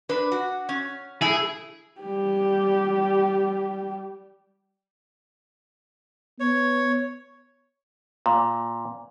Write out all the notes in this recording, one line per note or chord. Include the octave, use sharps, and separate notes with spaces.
D4 B4
F#4
C#4
A3 E4 G#4
G3 G4
B3 C#5
A#2